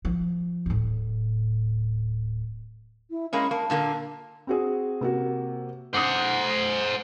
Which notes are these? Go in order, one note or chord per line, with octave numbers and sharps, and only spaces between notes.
F3
D1 A2
E4
G#3 A#3 C#4 B5
A#3 A5
A#2 D3 A#3
C4 F#4 G#4
C3 A#3 F#4
C5 F#5 D6 D#6